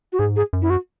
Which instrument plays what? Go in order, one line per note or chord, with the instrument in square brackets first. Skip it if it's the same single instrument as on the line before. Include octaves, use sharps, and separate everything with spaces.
[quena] F#4
[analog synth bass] G#2 [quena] G#4
[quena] G#4
[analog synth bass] F#2
[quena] E4
F#4